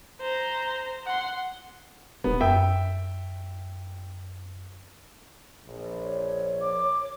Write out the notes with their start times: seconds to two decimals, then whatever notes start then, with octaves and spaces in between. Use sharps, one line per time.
0.21 C5 A#5
1.07 F#5 C6
2.24 E1 B3
2.41 F#2 E5 G5
5.67 A#1
6.02 C#5
6.61 D6